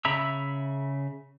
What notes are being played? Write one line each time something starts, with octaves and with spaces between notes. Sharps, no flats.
C#3 E5 A#5 B5 E6